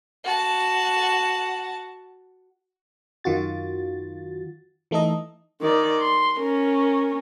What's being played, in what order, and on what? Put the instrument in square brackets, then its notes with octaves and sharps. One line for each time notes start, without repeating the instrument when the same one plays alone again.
[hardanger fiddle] F#4 A5
[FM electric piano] F#2 D#3 F4 F#4 A6
E3 A3 D#4 A4 D#5
[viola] D#3 D5
C6
C#4 A#4